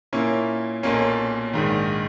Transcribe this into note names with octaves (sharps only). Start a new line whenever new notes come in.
A#2 A#3 C#4 E4
B1 A#2 A#3 C#4
A#1 G#2 D#3